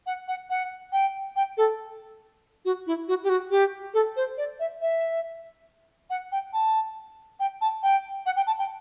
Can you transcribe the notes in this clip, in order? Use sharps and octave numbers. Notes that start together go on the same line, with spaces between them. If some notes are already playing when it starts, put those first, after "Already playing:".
F#5
F#5
F#5
G5
G5
A4
F#4
E4
F#4
G4
F#4
G4
A4
C5
D5
E5
E5
F#5
G5
A5
G5
A5
G5
F#5
G5
A5
G5